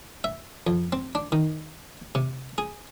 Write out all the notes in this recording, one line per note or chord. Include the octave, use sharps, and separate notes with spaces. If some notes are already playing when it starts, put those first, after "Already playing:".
E5
F2
C4
D4
D#3
C3
G#4